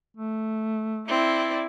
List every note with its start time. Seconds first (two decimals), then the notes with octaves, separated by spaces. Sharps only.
0.17 A3
1.08 C4 E4 D5